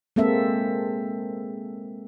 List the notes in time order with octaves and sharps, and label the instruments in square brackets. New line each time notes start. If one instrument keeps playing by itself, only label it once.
[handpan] G#3 A#3 C4 A4 E5